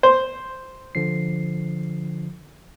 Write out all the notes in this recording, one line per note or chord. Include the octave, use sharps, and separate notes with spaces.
C5
D3 F3 C7